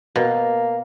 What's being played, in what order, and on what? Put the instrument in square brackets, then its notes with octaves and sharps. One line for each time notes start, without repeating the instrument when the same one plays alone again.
[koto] B2 [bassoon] A#3